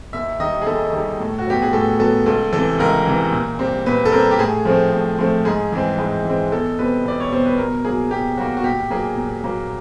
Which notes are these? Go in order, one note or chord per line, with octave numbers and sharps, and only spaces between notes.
D#2 E5
D#3 G3 D#5
G#4
D#2 A4
D#3 G3
A2
F#4
F#3 B3 G4
G#4
A2 A4
F#3 B3 A4
C#2 A4
C3 E3 A4
C#2 A#4
C3 E3
A#2
G3 C4
A#2 B4
A4
G3 C4 A#4
G4
A2 G#4
F3 A3 C4
A2
F3 A3 C4
G#2 G#4
E3 G#3 C4
G#2
E3 G#3 C4
E2 A4
B2 G3 C4 B4
E2 D5
C#5
B2 G3 C4 C5
B4
B2 A#4
F#3 A#3 G#4
B2 G4
F#3 A#3 F#4
F#4
A#2 G4
F#3 A#3 G#4
A#2
F#3 A#3